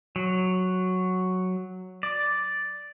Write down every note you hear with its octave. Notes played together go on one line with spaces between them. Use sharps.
F#3
D5